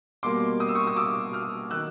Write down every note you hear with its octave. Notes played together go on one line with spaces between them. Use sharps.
B2 G3 A#3 C6 D6
D#6
E6
C#6 D#6
D#6
D6 E6
D#6 F6
D#3 F#3 E6 F#6